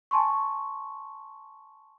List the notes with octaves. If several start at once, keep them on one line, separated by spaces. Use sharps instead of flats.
G#5 A5 C6 C#6